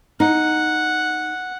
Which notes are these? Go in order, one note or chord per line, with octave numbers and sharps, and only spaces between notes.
D#4 F#5